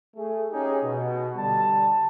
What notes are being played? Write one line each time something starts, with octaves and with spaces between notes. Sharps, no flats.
A3 G#4
C#4 D#4 G4 G#4
B2
D3 G3 A5